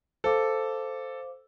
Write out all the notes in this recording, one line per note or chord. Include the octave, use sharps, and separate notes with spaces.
A4 C5 F5 D6